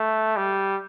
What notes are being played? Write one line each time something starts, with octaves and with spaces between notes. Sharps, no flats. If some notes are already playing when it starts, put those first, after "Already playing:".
Already playing: A3
G3